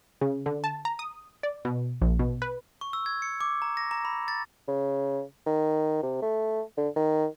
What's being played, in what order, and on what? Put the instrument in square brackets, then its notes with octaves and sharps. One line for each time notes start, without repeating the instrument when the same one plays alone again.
[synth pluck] C#3
D3
A5
A#5
D#6
D5
B2
A#1
B2
B4
[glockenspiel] C#6
E6
G#6
C#7
D6
A#5
A#6
A#5
B5
A6
[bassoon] C#3
D#3
C3
A3
D3
D#3